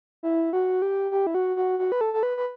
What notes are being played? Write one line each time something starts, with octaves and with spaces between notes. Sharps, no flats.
E4
F#4
G4
G4
E4
F#4
F#4
F#4
B4
A4
A4
B4
B4